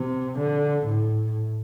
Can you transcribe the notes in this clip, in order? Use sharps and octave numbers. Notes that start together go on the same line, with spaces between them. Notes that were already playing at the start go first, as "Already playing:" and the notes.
Already playing: C3
D3
A2